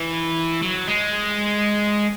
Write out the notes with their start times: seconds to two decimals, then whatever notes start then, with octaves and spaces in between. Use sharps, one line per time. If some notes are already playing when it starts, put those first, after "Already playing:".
Already playing: E3
0.62 F#3
0.88 G#3